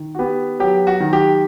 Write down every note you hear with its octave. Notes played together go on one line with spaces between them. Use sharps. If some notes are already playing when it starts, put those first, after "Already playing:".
Already playing: D#3
F#4
B3 G4
F#3 G4
F#4
D#3
G4